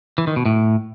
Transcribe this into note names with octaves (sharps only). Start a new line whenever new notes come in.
E3
D#3
B2
A2